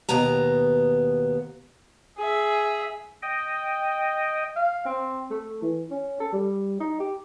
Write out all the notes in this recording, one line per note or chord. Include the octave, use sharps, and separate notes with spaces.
D#2 B2 B3 A#5
G#4 E5
D#5 G5
F5
C4
A3
E3
C#4
A4
G3
D#4
G4